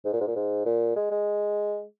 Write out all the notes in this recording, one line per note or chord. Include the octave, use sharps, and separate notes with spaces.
G#2
A#2
G#2
A#2
G#2
A#2
G#3
G#3